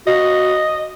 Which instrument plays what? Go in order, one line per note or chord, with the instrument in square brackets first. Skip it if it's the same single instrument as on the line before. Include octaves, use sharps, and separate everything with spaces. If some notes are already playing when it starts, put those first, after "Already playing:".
[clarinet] F#4 [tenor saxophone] D#5